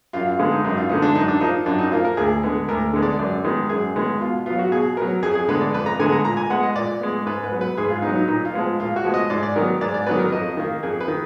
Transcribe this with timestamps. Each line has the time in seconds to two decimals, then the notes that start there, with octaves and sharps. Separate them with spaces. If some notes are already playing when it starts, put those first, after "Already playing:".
0.13 F#2 F4
0.26 F4
0.39 D3 G#3 B3 F4
0.52 D#4
0.64 F#2 D#4
0.77 F4
0.89 D3 G#3 B3 D#4
1.02 D4
1.15 F#2 D#4
1.28 D4
1.41 F3 A#3 D#4
1.66 F#2 D4
1.79 D#4
1.91 F3 A#3 F4
2.05 A#4
2.17 D2 G#4
2.43 D3 G#3 B3
2.68 D2 A#4
2.93 D3 G#3 B3
3.02 D5
3.19 F#2 D5
3.44 D#3 G#3 B3
3.69 F#2 G#4
3.96 D#3 G#3 B3
4.21 B2 F4
4.46 F#3 B3 F4
4.59 F#4
4.72 B2 G#4
4.97 F#3 B3 A#4
5.22 F2 G#4
5.35 G#4
5.48 D3 G#3 B3 B4
5.61 D5
5.74 F2 B4
5.86 A#5
5.99 D3 G#3 B3 G#5
6.12 A#5
6.25 A#2 A#5
6.37 G#5
6.50 G#3 B3 F#5
6.63 D#5
6.76 A#2 D5
7.01 G#3 B3
7.26 G#2 B4
7.44 B4
7.52 F#3 B3
7.61 B4
7.77 G#2 G#4
7.90 F4
8.02 F#3 B3 D#4
8.16 D#4
8.28 A#2 D#4
8.45 F4
8.54 F3 G#3 B3
8.80 A#2 F4
8.96 F#4
9.04 F3 G#3 B3
9.14 D#5
9.30 G#2 D5
9.43 D5
9.56 D#3 F#3 B3 A#4
9.81 G#2 D5
9.94 D5
10.06 D#3 F#3 B3 B4
10.19 A#4
10.32 F2 D#5
10.57 D#3 A#3
10.83 F2 G#4
11.00 B4
11.08 D#3